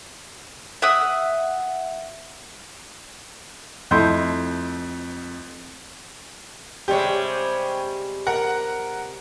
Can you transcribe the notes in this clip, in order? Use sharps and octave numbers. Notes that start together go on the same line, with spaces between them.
E5 F#5 D#6
F2 A3 E4 D#5 C6 G6
C3 G3 G#3 G4 C#5
A#4 F#5